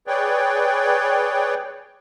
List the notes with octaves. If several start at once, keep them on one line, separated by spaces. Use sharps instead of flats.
G#4 B4 C#5 D5 G5